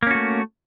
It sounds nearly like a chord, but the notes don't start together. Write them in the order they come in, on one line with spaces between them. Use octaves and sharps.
A#3 C#4 F#4 A3